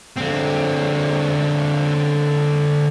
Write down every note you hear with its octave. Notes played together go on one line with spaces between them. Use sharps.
D3 C4